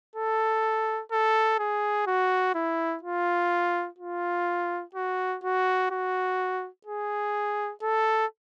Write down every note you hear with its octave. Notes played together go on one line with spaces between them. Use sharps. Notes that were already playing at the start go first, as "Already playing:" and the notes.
A4
A4
G#4
F#4
E4
F4
F4
F#4
F#4
F#4
G#4
A4